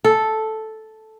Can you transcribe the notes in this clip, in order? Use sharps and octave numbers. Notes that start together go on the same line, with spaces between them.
A4